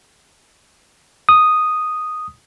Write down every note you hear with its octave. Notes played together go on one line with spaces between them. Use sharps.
D#6